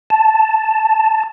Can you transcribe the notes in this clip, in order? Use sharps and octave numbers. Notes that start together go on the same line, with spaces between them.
A5